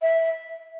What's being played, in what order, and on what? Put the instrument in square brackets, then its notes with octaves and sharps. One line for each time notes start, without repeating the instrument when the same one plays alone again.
[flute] E5